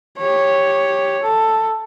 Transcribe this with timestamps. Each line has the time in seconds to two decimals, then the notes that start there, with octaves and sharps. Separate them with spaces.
0.18 G4 C#5
1.23 A4